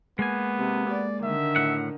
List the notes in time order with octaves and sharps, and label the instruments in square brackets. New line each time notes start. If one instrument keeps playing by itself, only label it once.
[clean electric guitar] G#3 A#3 G#5 [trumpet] B3
[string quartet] C3
D5
[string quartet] D3 D#3 [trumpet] E5
[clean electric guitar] A2 F#5